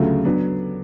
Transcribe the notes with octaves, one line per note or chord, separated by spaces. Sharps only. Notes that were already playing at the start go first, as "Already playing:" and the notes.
Already playing: D2 C#3 F#3 A3 F4
F#3 B3 D4